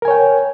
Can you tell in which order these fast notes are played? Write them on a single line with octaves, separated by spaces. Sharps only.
A#4 G#5 C#5 G5